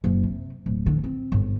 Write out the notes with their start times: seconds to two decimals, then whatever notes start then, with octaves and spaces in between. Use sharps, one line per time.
0.04 F#1 C#4
0.23 C3
0.66 D1
0.86 D3
1.04 C4
1.32 G1 G#2